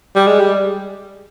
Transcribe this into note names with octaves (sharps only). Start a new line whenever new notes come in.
G3
G#3
G3